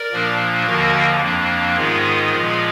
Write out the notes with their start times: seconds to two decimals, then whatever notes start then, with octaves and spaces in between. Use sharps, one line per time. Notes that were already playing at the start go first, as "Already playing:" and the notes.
Already playing: A#4 D5
0.12 A#2 F3 A#3 D4
0.67 D#2 D3 F3 A#3 F#4 A#4
1.22 F2 F3 A#3 D4
1.76 G#2 D#3 G#3 B3 F4 G#4
2.32 A#2 F3 G#3 B3